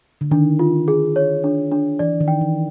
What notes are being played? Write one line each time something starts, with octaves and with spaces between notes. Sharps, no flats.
D3
D#3 D4
F4
G#4
C#5
D4
D4
E3 D5
D#3
G5
E3